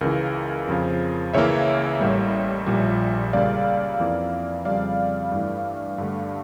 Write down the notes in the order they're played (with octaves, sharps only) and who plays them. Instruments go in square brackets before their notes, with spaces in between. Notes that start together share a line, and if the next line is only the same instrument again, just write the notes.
[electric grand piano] C#2 C#3 E3 A#4
F2 C#3 F3
C#2 C#3 E3 A#3 C#5 E5
A1 A2 G3 A#3
A#1 A#2 G3
C#2 C#3 G3 A#3 D5 F5
F2 E3 A#3
F2 C#3 G3 D5 F5
G2 E3 A3
G2 D3 A3